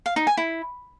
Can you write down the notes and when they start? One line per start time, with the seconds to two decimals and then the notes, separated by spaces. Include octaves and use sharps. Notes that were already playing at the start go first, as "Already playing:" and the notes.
0.06 F5
0.16 D#4
0.27 G#5
0.37 E4